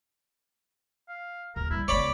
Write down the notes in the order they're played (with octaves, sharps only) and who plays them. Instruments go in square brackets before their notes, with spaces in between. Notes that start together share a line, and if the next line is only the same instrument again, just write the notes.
[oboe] F5
[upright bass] D#1 [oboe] A#4
[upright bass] F#3 G3 [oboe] E4
[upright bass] C#2 B3 [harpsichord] C#5 D5 B5 [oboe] D6